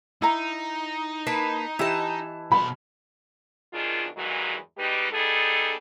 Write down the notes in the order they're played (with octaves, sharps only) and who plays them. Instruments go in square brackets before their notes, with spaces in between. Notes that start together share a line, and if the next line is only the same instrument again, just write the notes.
[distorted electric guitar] D#4 [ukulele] E4 A#5
[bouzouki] A#3 B4 A5
[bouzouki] E3 A5 [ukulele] E4 G4 D#5
[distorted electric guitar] B2 C6 [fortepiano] B5
[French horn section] F#2 B2 D#3 D4 F4 G#4
E2 G2 D#3 E3 F#3 G#3
B2 G3 G#3 D#4 G4 B4
G3 B3 D#4 G#4 A4